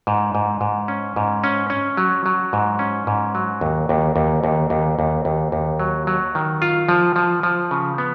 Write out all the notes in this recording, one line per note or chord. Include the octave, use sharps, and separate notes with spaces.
G#2
G#2
G#2
C#4
G#2
C#4
C#4
F#3
F#3
G#2
C#4
G#2
F#3
D#2
D#2
D#2
D#2
D#2
D#2
D#2
D#2
F#3
F#3
D#3
F4
F3
F3
F3
C#3
B3